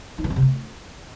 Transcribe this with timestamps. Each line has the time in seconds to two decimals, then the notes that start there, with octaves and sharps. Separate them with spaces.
0.18 D#4
0.24 E3
0.30 C4
0.36 C3
0.42 A3